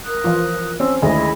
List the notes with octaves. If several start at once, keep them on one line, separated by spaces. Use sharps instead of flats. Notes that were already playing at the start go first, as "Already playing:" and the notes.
A#4 D#6 F#6
E3 F3 F4
C4 C#4 E6
D2 D#3 G#3 E4 G#4 D#5